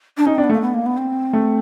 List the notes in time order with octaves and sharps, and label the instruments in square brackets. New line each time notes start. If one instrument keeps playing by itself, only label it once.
[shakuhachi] D4
[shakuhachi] C#4 [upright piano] D#4
[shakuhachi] C4 [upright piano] D4
[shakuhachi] B3
[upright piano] A3
[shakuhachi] A#3
B3
A#3
B3
C4
[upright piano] A3